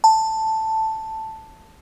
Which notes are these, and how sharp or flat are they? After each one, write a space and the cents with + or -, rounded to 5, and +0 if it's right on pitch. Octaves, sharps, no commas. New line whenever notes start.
A5 +5